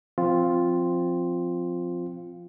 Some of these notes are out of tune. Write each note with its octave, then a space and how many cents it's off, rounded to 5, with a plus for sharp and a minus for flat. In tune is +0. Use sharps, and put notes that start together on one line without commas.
F3 +0 C4 +0 F4 +0